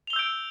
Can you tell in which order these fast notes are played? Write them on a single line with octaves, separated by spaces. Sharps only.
F7 G7 E6 G6 D7